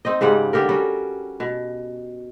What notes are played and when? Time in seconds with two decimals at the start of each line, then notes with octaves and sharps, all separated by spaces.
0.05 C4 D#4 D#5
0.21 G#2 C#3 G3 F#5
0.53 D3 G4 A4 A#4
0.69 G3 C#4 F#4
1.40 B2